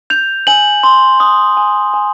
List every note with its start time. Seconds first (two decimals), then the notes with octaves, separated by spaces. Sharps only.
0.10 G6 F7
0.47 G#5 F#7
0.83 C6
1.20 D#6
1.57 G#5
1.94 G#5